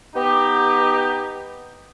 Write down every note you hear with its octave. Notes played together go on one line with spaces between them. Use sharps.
B3 D#4 G4